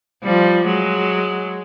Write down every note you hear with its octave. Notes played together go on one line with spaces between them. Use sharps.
F3 G3
F#3 G#3